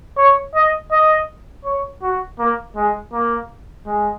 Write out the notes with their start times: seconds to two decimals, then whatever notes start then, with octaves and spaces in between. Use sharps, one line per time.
0.18 C#5
0.55 D#5
0.92 D#5
1.65 C#5
2.03 F#4
2.39 A#3
2.76 G#3
3.13 A#3
3.86 G#3